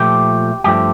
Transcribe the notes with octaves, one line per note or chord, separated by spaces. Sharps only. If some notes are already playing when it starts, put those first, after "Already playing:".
Already playing: A#2 F3 A3 G4
G2 F3 A3 G4